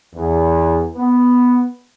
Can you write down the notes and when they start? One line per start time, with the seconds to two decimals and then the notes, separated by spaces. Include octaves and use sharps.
0.14 E2
0.96 B3